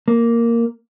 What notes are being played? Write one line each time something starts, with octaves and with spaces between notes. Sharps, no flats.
A#3